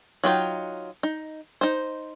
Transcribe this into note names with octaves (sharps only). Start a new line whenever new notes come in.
F#3 D#4 F4 G5
D#4
D#4 C5